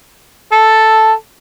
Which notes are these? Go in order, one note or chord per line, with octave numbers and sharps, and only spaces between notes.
A4